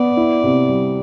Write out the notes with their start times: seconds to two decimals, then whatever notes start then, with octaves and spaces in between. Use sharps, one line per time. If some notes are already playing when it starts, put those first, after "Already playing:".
Already playing: B3 D5
0.17 E4
0.43 C3
0.69 G3